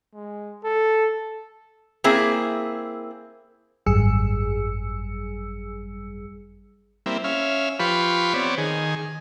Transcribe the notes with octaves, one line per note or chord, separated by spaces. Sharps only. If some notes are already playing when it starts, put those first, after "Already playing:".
G#3
A4
A#3 C4 E4 G#4
G#1 F#2 G3 G#4 E6 C#7
G3 A#3 C4 E4
C#4 E5 F5
F3 F4 G4 B4 B5 C#6
B3 C4 C#5 D5
D#3 G#4